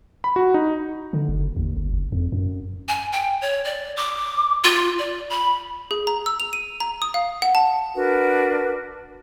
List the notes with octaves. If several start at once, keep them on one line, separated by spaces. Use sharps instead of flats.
B5
F#4
D#4
D3
F#1
D#2
G1
F#1
F2
F#2
G#5
G5
C#5
D5
D6
F4
D5
B5
G#4
A#5
E6
F7
D#7
A#5
D#6
F5
F#5
A5
D4 F#4 A#4 B4